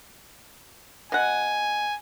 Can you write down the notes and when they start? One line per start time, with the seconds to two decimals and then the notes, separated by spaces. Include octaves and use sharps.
1.12 B2 F#5 G#5